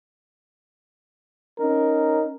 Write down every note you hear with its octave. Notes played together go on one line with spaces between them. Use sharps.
C#4 D#4 A#4